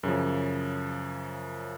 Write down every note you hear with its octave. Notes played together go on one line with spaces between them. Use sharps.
F#2 C#3 F3